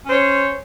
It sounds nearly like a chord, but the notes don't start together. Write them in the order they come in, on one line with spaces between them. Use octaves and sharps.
C#4 C5 C#5